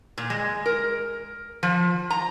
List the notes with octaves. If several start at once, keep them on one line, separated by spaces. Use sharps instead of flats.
A#2
G#3
A#4
F3
A#5